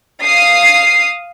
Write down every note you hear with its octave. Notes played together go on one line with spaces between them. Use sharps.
F5 D#6 C7